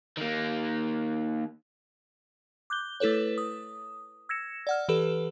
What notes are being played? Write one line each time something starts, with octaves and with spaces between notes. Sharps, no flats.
D#3 A#3
D6 F#6 G6 G7
A3 E4 A4 B4 C#5
D#6
E6 G#6 A#6 C#7 E7
D5 F#5 F6
E3 G4 A4 B4